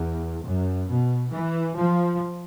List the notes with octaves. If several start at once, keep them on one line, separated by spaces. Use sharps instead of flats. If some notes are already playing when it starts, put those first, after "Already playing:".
Already playing: E2
F#2
B2
E3
F3